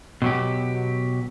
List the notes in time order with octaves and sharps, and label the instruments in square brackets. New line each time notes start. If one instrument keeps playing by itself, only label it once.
[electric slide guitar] B2 F#3 G4